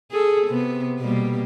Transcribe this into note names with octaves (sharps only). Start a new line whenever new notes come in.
G#4 A4
C3 B3
B2 G3 A#3